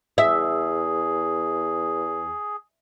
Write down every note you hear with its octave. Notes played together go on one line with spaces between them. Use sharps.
E2 G#4 E5